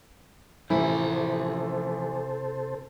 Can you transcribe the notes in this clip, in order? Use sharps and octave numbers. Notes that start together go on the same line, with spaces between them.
A1 C3 E3 F3 E4 A4 A#4 C5